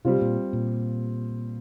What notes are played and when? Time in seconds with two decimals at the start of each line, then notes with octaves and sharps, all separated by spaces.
0.05 C3 G3 C4 F4
0.21 A#2
0.53 A#2